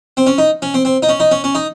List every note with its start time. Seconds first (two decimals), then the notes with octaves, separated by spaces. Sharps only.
0.17 C4
0.27 C#4
0.38 D#4
0.62 C#4
0.74 C4
0.85 C4
1.02 D#4
1.09 C#4
1.20 D#4
1.31 C#4
1.44 C#4
1.55 D#4